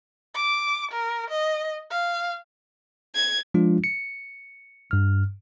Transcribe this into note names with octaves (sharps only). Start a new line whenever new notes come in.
D6
A#4
D#5
F5
G#6
F3 G#3 D4 F4
C#7
G2 F6